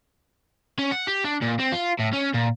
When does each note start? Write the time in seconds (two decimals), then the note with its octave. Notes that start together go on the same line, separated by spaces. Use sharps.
0.79 C#4
0.92 F#5
1.07 G4
1.24 D4
1.41 A#2
1.59 C4
1.72 F4
2.00 A2
2.14 C#4
2.34 A#2